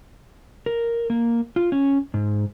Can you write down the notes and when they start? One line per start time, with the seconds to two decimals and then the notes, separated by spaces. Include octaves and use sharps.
0.66 A#4
1.10 A#3
1.56 F4
1.72 C#4
2.14 G#2